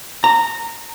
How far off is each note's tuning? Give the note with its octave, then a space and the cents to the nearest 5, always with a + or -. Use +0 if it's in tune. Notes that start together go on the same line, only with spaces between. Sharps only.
A#5 -20